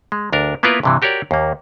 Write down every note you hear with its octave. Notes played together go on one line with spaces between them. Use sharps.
G#3
D2 D4 A#4
A#3 B3 E4 F4 A#4 B4
G2 C3 E3
F#4 G4 A#4 C#5 D5
D#2 A#3